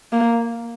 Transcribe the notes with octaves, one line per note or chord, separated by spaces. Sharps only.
A#3